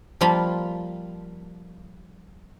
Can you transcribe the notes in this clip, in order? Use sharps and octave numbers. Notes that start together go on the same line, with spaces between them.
F3 G3 A#3 F4 B5